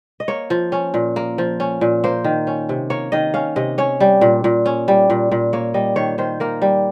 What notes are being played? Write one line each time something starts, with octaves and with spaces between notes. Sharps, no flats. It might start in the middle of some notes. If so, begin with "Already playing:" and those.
D#5
A#3 C#5
F3
C#4
A#2
A#3
F3
C#4
A#2
A#3 C5
D#3
C#4
C3
A#3 C#5
D#3 D#5
C#4 F5
C3 D#5
C#4 C#5
G3
A#2
A#2
C#4
G3
A#2
A#2
A#3 C#5
G3 D#5
D#3 C#5
D#3 C5
A#3 A#4
G3